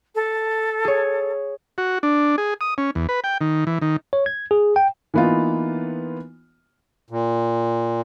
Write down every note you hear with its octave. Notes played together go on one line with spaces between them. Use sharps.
A4
G#4 C#5
F#4
D4
G#4
D#6
C#4
E2
B4
G5
D#3
E3
D#3
C#5
G#6
G#4
G5
E3 A#3 B3 D#4 F4
A#2